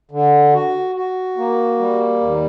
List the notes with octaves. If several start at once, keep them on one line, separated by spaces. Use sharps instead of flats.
D3
F#4
F#4
A#3
G3
D#2